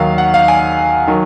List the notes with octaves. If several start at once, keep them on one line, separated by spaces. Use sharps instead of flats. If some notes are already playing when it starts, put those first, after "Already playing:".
Already playing: D#2 D#3 F#3 F5
F#5
F5
G#5
D#3 F#3